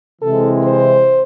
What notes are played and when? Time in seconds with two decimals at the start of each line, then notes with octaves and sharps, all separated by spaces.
0.22 C3 E3 G#3 C4 E4 A4
0.63 C5